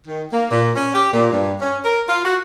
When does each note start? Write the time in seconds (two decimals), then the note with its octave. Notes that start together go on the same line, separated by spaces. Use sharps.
0.07 D#3
0.32 A#3
0.51 A#2
0.75 C#4
0.94 G4
1.13 A#2
1.32 G2
1.61 C#4
1.84 A#4
2.09 F4
2.24 F#4